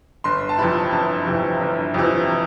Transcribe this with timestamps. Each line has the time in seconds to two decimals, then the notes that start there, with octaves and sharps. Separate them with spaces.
0.24 G1 C6
0.49 A5
0.58 F2 C3 E3 B5
0.92 G1 A5
1.26 F2 C3 E3
1.61 G1
1.94 F2 C3 E3